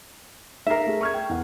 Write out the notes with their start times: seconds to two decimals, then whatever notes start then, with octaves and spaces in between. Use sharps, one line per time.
0.67 D#4 A#4 E5 C7
0.87 A3 G#4
1.01 C#6 F6 G#6
1.14 G5
1.29 E2 F#5